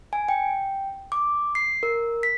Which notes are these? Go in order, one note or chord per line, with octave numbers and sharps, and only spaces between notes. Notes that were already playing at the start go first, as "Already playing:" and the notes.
G#5
G5
D6
C7
A#4
B6